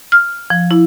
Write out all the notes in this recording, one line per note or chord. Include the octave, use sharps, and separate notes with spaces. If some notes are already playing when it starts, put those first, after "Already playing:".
F6
F3
E4